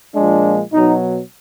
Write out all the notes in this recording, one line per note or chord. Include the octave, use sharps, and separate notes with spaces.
A#2 F3 G#3 D4
B2 F#3 D#4